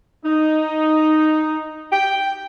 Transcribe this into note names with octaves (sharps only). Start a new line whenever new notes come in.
D#4
G5